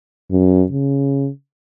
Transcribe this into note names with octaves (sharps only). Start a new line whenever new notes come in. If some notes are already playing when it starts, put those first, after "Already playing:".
F#2
C#3